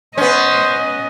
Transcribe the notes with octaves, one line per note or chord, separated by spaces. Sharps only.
B3 C#4 C5 D#5